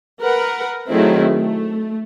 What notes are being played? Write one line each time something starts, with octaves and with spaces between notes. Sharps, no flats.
A#4 B4 F#5
D#3 F#3 A3 C4 E4 G#4
A3